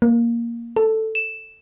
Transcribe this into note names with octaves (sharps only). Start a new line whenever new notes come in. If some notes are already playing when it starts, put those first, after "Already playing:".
A#3
A4
E7